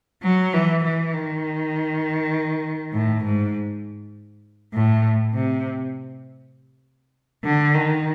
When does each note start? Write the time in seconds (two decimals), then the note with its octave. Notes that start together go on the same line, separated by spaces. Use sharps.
0.23 F#3
0.54 E3
0.84 E3
1.14 D#3
2.93 A2
3.24 G#2
4.74 A2
5.34 C3
7.44 D3
7.74 D#3